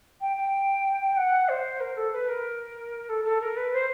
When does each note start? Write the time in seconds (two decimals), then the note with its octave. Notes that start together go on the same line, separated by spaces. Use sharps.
0.20 G5
0.36 G5
1.16 F#5
1.48 C5
1.80 A#4
1.96 A4
2.12 B4
2.28 A#4
3.09 A4
3.24 A4
3.41 A#4
3.56 B4
3.73 C5